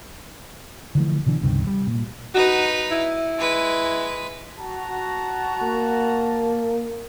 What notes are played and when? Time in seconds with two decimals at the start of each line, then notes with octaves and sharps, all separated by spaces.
0.95 D3 E3 F3 A3
1.26 B2 D3 E3 D4
1.42 C#2 G2 C3 D#3
1.67 G3
1.87 A#2
2.35 D#4 F#4 B4
2.91 E4
3.38 G#3 B4
4.59 F#4 A5 A#5
5.62 A#3